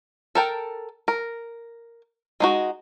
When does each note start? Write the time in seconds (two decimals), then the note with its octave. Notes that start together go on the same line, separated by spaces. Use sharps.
0.35 A4 A#4 G5
1.08 A#4
2.40 G#3 D#4 F#4